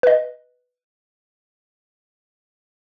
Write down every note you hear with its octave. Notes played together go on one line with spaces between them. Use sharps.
B4 D#5